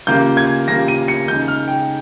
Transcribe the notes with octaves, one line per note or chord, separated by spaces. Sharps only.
C#3 G3 A#3 F4 G6
G#6
C#3 G3 A#3 F4 A#6
D#7
C#7
C#3 G#3 D#4 G6
F6
G5